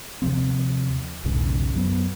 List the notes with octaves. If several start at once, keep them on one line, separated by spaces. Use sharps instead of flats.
D#2 C3 F3 C4
B1 E2 G#2 C#3
F#2 F#3 B3